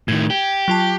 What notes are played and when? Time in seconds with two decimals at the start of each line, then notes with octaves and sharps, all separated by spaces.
0.08 A2 D#3 G#6
0.30 G4
0.68 F#3 F4 A5